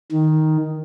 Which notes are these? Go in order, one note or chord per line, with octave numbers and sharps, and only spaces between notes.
D#3